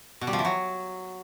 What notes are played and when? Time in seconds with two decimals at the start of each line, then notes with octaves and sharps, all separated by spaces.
0.21 B2
0.27 G3
0.33 F3
0.39 E3
0.45 F#3